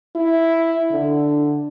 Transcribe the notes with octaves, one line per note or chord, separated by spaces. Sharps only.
E4
D3